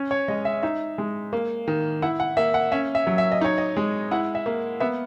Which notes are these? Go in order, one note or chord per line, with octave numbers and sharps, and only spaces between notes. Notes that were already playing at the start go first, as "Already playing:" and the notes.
Already playing: C#4
C#5
G#3 D#5
E5
D#4 E5
G#3
A#3
D#3
E4 F#5
F#5
A#3 E5
F#5
C#4 E5
E5
F#3
E5
D#5
D#4 C#5
D#5
G#3
E4 F#5
E5
A#3
B3 E5